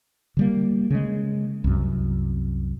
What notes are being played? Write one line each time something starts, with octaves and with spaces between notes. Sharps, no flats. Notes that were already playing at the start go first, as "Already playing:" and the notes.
D3 G3 A#3
C#3 G#3
C2 F#2